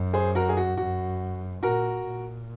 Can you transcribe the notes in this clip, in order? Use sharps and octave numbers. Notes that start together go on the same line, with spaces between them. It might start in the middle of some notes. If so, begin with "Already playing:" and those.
Already playing: F#2
G#4 C5
F#4 A#4
G#4
F#4
F#2 F#4
A#2 F#4 A#4
A#2